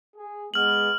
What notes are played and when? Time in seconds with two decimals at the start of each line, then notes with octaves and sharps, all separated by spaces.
0.16 G#4
0.54 G#3 B3 F6 F#7